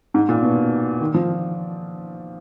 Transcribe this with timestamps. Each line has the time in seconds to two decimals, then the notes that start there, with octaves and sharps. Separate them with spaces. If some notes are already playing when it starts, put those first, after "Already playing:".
0.14 G#2
0.29 A#2
0.42 B2
1.00 D#3
1.14 F3